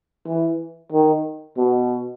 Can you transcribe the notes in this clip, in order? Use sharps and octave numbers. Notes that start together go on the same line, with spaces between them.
E3
D#3
B2